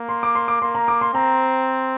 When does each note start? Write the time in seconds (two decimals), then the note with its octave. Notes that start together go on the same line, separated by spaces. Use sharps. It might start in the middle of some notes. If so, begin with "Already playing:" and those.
Already playing: A#3
0.09 C6
0.23 D6
0.35 C6
0.48 D6
0.62 A#3 C6
0.75 A#5
0.88 D6
1.01 C6
1.14 C4 A#5